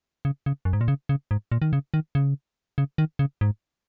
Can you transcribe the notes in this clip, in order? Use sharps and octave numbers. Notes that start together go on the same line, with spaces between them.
C#3
C#3
F#2
G#2
A#2
C#3
C#3
G#2
A#2
D#3
C#3
D#3
C#3
C#3
D#3
C#3
G#2